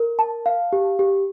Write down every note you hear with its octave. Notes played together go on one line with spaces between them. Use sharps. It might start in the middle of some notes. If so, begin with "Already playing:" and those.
Already playing: A#4
A5
F5
G4
G4